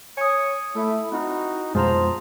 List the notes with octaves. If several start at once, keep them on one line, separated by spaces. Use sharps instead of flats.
C#5 G#5 D#6
A3 E4
C4 D#4 E4 F#4
F2 B2 G#3 F4 G#4 C5 A5 A#5